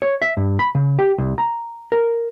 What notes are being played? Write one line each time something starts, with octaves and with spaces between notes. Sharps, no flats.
C#5
E5
G2
B5
C#3
G4
C2
A#5
A#4